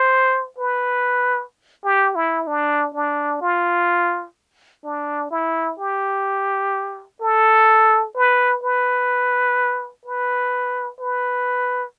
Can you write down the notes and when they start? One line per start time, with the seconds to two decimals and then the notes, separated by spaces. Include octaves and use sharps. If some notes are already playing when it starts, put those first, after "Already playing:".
Already playing: C5
0.58 B4
1.84 G4
2.16 E4
2.47 D4
2.94 D4
3.41 F4
4.84 D4
5.31 E4
5.79 G4
7.21 A4
8.15 B4
8.63 B4
10.05 B4
11.00 B4